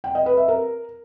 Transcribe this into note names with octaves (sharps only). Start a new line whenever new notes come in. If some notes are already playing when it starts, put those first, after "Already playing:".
G5
D#5
B4
E5
A#4